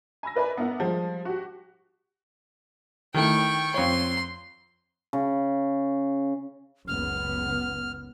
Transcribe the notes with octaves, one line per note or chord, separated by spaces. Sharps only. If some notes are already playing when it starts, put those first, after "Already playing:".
G#5 B5 E6 A#6
A#4 B4 D5 E5 G#5 B5
B3 D4 E4 A#4 F#5
F3 G3 G#3
F#4 G4
D#3 A3 E4 G5 C#6
F2 C#5 C6
C#3
F#1 C#2 B3 F6